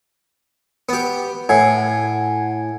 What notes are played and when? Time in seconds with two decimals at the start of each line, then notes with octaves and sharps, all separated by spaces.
0.89 B3 G4
1.49 A2 F#5 G#5 G#6